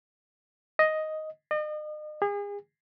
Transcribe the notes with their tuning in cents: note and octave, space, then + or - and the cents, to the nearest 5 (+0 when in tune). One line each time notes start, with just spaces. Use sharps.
D#5 +5
D#5 -40
G#4 -35